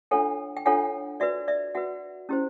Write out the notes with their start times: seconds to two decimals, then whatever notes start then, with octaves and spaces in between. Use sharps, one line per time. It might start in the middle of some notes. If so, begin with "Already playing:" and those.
0.11 D4 F4 A4 C#5 F#5 G#5
0.57 G5
0.66 D4 F4 A4 C#5 F#5 G#5
1.20 F#4 B4 D5 E5
1.48 D5 E5
1.75 F#4 B4 E5 F#5
2.29 C#4 E4 G4 C5